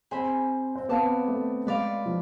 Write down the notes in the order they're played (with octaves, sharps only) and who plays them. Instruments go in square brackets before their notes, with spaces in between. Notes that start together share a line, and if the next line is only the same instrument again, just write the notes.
[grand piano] C4 [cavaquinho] G#4 C5 G#5 B5
[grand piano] C4
[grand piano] B3 [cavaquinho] D5 F5 A5 D6
[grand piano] A3
[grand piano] G#3 [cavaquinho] B4 D5 F5
[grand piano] F3